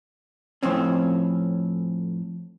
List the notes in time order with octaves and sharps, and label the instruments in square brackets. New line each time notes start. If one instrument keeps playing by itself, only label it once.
[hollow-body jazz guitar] F2 A2 C4 C#4